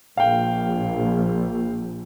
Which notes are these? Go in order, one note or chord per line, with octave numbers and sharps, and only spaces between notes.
A#1 F5 G5